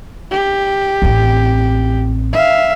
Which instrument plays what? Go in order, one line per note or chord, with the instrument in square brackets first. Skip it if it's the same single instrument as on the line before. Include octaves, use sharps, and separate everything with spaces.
[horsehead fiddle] G4
[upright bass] A1 C4
[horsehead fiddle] E5 F5